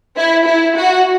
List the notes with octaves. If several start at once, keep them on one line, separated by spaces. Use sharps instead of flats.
E4
E4
F#4